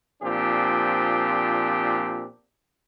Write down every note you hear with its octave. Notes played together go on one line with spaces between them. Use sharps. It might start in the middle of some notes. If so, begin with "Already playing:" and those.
A#2 F3 C4 D4 G4